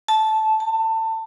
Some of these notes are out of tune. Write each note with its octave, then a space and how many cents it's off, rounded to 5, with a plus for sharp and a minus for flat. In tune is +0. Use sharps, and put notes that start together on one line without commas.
A5 -10
A5 +25